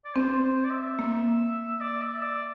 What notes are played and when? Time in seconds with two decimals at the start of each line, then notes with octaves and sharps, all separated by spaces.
0.05 D5
0.15 C4 C5
0.43 C5
0.64 D5
0.71 E5
0.99 A#3
1.81 D5
2.02 E5
2.22 D5